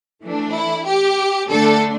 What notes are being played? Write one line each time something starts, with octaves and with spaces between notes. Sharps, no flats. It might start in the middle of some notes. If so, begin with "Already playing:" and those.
E3 A3 D4
E4
G4
D3 A3 D4 A4